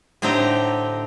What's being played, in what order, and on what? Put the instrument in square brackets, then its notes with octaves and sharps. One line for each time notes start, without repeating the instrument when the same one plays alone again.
[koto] A2 D3 C4 D#4 G4 A#5